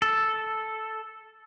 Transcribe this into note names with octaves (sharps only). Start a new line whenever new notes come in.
A4